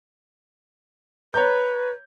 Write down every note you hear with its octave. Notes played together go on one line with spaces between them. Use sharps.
B4 C#5 A#5 G6